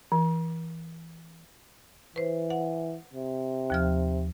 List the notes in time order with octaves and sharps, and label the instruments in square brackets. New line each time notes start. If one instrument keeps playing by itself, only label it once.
[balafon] E3
[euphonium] E3 [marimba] B4 C5
[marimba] F#5
[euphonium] C3
[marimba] D#2 F3 F6